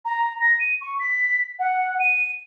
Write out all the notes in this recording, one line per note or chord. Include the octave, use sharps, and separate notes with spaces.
A#5
A#6
D#7
C#6
B6
F#5
D#7